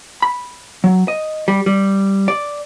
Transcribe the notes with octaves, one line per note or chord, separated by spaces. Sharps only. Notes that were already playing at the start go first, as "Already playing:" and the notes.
B5
F#3
D#5
G3
G3
D5